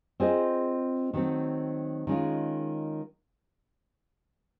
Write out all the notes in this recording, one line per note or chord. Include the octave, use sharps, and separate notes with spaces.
C4 F4 G#4 C5 D#5
D#3 F#3 A3 C4
D#3 G#3 C#4 F4